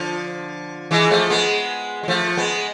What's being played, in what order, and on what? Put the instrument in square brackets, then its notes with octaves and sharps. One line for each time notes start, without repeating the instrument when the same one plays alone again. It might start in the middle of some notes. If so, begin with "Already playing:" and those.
Already playing: [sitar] D3 F3
E3 G#3
F3 A3
G#3 B3
G#3
F3 A3
G#3 B3